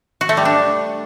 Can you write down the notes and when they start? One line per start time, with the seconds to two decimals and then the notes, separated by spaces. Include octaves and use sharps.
0.21 F#4
0.29 A3
0.37 G3
0.45 D4